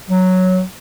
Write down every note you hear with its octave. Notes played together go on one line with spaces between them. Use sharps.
F#3